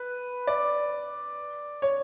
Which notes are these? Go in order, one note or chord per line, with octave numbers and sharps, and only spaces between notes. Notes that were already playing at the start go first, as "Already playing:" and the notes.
Already playing: B4
D5
C#5